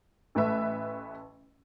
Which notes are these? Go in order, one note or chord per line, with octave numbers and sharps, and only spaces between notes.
A1 A3 B4 E5